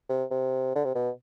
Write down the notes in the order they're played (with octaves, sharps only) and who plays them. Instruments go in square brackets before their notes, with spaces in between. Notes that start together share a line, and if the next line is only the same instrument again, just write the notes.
[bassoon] C3
C3
D3
C3
B2